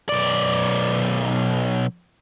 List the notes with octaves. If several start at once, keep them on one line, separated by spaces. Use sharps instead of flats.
B1 D5